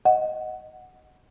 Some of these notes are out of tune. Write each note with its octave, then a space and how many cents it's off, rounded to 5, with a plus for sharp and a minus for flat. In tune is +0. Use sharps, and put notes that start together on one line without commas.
D#5 +0 F#5 +0